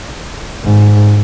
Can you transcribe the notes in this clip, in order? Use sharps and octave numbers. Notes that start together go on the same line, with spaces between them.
G#1 G#2